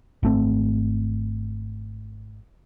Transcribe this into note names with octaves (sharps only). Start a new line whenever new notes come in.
G#1 A3 C4